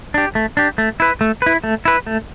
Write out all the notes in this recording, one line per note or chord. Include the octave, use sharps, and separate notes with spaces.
D4 G4
A3
D4 G4
A3
E4 B4
A3
E4 B4
A3
E4 B4
A3